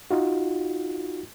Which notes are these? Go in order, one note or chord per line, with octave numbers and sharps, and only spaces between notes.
D#4 F4 F#4